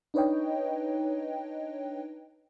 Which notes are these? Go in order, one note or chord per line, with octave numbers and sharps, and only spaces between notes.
D4 D#4 B4 C#5 D#5 G5